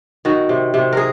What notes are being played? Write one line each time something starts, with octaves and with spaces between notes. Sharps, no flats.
D#3 F#4
C3
C3
G#4 A#4